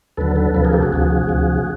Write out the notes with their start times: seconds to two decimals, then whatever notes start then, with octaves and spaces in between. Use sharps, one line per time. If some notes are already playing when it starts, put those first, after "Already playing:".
0.17 D#2 D3 F#3 A4 B4
0.36 A4 B4
0.54 D2 C3 F3 A4 B4
0.65 G#4 A#4
0.73 G4 A4
0.83 F#4 G#4
0.93 D2 C3 F3
1.29 D2 C3 F3